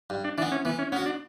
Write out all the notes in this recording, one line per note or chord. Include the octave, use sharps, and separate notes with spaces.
G2
D4
E3 B3 D4
C#4
E3 B3
C#4
B3 C#4 F#4
D4